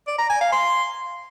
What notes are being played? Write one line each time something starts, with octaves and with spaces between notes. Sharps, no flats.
D5
A#5
G#5
F5
C6